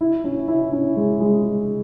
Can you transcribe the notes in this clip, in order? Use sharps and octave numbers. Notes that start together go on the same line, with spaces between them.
E4
C#4
E4
C#4
G#3
G#3